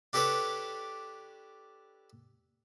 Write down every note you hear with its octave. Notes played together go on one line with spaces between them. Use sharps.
D4 G4 A4 B4 C#5 D6